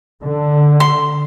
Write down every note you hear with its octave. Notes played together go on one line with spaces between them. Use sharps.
D3
C6